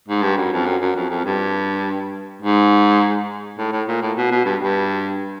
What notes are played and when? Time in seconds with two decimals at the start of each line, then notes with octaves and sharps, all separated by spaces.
0.08 G#2
0.22 G2
0.37 F#2
0.52 F2
0.66 F#2
0.81 F#2
0.96 F2
1.10 F2
1.25 G2
2.42 G#2
3.58 A2
3.73 A2
3.88 A#2
4.02 A2
4.17 B2
4.31 B2
4.45 G2
4.61 G2